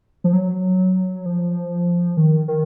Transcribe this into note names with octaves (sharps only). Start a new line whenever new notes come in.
F3
F#3
F3
D#3
D#3